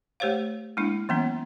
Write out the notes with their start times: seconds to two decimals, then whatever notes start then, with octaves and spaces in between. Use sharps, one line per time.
0.20 A3 G4 C5 C#5 F5
0.77 G#3 A#3 D4 E4
1.09 E3 F#3 A#3 B3 C#4